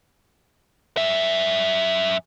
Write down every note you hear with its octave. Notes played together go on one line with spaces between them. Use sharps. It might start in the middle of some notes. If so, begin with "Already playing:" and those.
F#2 E5